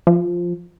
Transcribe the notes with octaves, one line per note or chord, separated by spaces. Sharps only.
F3